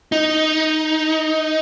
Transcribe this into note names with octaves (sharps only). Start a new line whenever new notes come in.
D#4